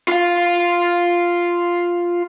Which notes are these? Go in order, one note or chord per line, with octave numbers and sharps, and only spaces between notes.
F4 F5